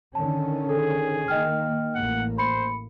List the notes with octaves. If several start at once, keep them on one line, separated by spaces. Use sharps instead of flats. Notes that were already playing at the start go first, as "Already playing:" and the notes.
D3 D#3 C#4 A5
G#4 A4
D#3 A#3 D#5 G5 F6
A1 A#3 F#5
C5 B5 C#7